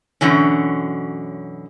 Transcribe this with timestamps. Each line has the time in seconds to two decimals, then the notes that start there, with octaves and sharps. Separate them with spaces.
0.21 F#2 B2 D3 E3 C#4